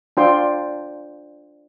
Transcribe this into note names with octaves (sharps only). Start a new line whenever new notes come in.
D4 F4 C5 G5 C6